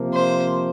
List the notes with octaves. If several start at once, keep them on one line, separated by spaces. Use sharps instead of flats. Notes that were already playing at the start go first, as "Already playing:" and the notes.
Already playing: C3 F3 A#3
C5